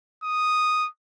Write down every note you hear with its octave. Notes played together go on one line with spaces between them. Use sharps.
D#6